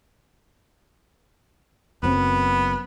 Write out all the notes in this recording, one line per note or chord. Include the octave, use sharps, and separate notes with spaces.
F#1 F#2 B3 C4